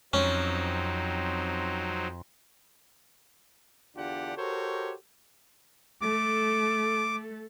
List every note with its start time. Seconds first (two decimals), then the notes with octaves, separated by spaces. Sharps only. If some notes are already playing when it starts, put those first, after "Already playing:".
0.13 F2 F#3 C4 C#4 D#4
3.97 E2 D3 D4 F4 G4 F#5
4.37 F#4 G4 A4 A#4 C5 C#5
6.01 A3 A4 D6